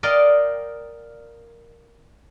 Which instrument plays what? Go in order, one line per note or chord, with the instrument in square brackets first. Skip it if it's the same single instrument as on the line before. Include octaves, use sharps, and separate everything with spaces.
[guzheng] A#4 D5 D#5 F5 G5 A#5